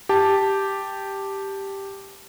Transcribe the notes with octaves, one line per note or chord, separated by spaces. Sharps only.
G4 A5